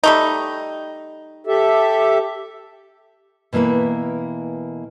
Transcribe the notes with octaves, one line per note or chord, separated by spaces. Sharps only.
G3 A3 D#4
G4 A4 E5
B2 E3 A#3 B4 E5